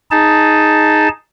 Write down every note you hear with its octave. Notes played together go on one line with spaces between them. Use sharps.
D#4 G#4 A5